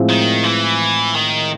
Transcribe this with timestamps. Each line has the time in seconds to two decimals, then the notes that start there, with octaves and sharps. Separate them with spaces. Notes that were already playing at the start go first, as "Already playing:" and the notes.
Already playing: A2 F3 G#3 C4 F4
0.09 D#3
0.44 E3
1.14 D#3